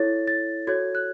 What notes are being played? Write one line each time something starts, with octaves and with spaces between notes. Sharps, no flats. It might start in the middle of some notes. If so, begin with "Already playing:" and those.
Already playing: E4 A4 C#5 A6
A6
F#4 A4 C#5 G#6
F#6